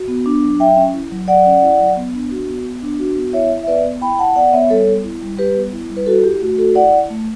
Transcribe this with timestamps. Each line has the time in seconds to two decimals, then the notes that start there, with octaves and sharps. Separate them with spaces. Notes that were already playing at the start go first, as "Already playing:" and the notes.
Already playing: F#4
0.08 B3
0.26 D4
0.43 F#3
0.60 F#3 E5 G5
0.77 C#4
0.94 E4
1.11 F#3
1.28 F#3 D5 F#5
1.46 C#4
1.62 E4
1.80 F#3
1.96 B3
2.14 D4
2.31 F#4
2.48 B3
2.65 B3
2.82 D4
2.99 F#4
3.16 B3
3.33 E4 C#5 E5
3.51 E4
3.63 E5
3.67 B3 B4 D5
3.85 B3
4.02 E4 G5 B5
4.19 E4 F#5 A5
4.36 B3 D5 F#5
4.53 B3 C#5 E5
4.70 G3 A4 C#5
4.87 B3
5.04 E4
5.22 G3
5.38 G3 G4 B4
5.56 B3
5.73 E4
5.90 G3
5.97 B4
6.06 E4 F#4 A4
6.24 E4 G4
6.41 A3 F#4
6.58 A3 F#4 A4
6.75 E4 D5 F#5
6.92 E4
7.10 A3